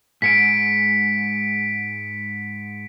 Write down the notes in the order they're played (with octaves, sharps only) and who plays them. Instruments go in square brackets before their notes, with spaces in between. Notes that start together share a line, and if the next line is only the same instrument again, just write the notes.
[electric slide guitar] G#2 G#3 [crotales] B6 C#7 D7